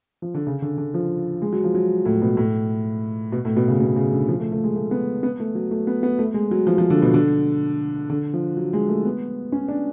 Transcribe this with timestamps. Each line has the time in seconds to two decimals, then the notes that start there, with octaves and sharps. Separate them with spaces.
0.22 F3
0.34 D3
0.47 C#3
0.62 D3
0.78 D3
0.94 F3
1.42 G#3
1.52 F#3
1.64 F3
1.75 F#3
2.05 A2
2.22 B2
2.37 A2
3.32 B2
3.45 A2
3.56 B2
3.68 C#3
3.80 B2
3.96 C#3
4.12 D3
4.28 F3
4.40 A3
4.52 A3
4.64 G#3
4.76 A3
4.91 B3
5.23 B3
5.40 A3
5.55 F#3
5.71 A3
5.87 B3
6.03 B3
6.19 A3
6.34 G#3
6.51 F#3
6.67 F3
6.78 F3
6.90 D3
7.02 B2
7.14 D3
8.10 D3
8.34 F3
8.57 F#3
8.73 G#3
8.89 A3
9.05 B3
9.52 C#4
9.68 D4